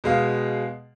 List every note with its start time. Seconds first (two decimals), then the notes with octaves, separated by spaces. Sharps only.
0.04 B2 G#3 F5